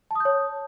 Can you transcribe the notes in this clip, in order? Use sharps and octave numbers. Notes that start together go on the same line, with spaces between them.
C#5 A5 D#6 G6